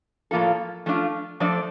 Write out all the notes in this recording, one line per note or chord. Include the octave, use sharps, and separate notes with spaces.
A2 F3 A#3 F4 A4
F3 A3 D4 F4
F3 A3 D4 A4 D5